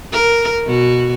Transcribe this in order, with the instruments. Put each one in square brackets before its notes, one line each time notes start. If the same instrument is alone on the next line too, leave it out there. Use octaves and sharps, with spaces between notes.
[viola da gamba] A#4
B2 F#4